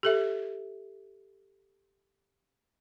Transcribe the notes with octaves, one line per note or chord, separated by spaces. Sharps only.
G4 A4 E5